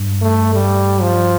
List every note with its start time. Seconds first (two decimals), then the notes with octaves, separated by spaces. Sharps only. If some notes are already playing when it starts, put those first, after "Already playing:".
Already playing: G2
0.22 A3
0.54 G3
1.02 F3